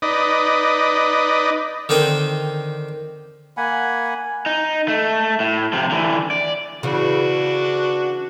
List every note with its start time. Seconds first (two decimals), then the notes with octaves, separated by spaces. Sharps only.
0.02 D#4 B4 D5 D#5
1.89 D3 D#3 C4 G5 D#6
3.57 A#3 F#5 G#5 B5
4.46 D#4
4.88 A3
5.40 A2
5.73 C3 F3
5.91 D3 E3
6.31 D5
6.83 C#3 E3 D4 F#4